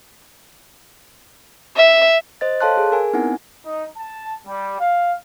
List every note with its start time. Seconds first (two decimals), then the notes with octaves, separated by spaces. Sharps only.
1.75 E5
2.41 C5 D#5 A6
2.60 A4 C#5 F5 A5 C6 F#6
2.77 G#4
2.92 A#4 G#5
3.13 B3 C4 D#4 E4 F#5 G#5
3.64 D#4
3.97 A5
4.47 G3
4.80 F5